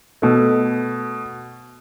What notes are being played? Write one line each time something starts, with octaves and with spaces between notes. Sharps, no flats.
B2 A3